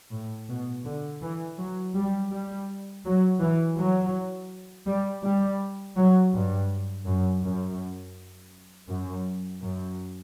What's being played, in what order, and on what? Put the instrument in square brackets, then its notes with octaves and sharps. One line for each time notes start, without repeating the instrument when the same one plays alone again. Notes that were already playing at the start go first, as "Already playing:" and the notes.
[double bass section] A2
B2
D3
E3
F#3
G3
G3
F#3
E3
F#3
G3
G3
F#3
G2
F#2
F#2
F#2
F#2